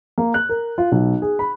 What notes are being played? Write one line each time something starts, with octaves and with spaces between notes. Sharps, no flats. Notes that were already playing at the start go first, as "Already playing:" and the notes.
A#3
F#6
A#4
F4
B1
G#4
B5